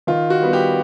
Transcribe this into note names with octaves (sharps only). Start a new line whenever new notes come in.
D#3 F4
F#4
G3 B3
G4